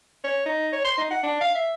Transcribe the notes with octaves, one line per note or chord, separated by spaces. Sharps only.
C#5
D#4
C#5
C6
D#4
F#5
D4
F5
E5